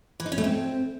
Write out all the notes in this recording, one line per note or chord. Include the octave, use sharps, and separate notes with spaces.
E3
D#4
C#4
A3
C4